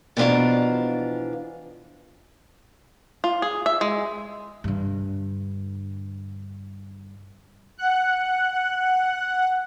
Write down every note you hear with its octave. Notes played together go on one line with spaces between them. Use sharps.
B2 E3 F3 D4 F5 A#5
F4
G#4
E5
G#3
G2 D3
F#5 F#6